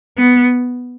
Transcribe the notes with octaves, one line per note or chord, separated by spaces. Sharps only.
B3